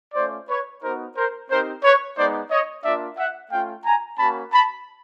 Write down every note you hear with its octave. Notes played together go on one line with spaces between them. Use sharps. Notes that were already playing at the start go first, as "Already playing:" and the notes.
A3 C#4 F4 C5 D5
B4 C#5
B3 D#4 F#4 A#4 C5
A#4 C5
C4 D#4 G4 A#4 C5
B4 C#5
G#3 B3 D#4 C5 D5
C#5 D#5
A#3 D4 F4 D5 E5
E5 F#5
A3 C#4 F4 F5 G5
G#5 A#5
A#3 C#4 F#4 A5 B5
A5 B5